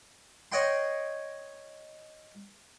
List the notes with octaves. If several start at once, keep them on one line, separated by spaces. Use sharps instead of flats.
C#5 D#5 F#5 G5 C6